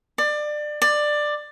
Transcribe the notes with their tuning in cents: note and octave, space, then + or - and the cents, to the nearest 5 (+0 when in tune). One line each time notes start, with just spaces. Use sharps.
D5 +25
D5 +15